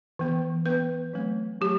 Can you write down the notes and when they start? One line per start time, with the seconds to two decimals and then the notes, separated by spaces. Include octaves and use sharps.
0.19 E3 B3
0.66 E3 B3 B4
1.13 F#3 A3 C4
1.61 F#3 A3 G4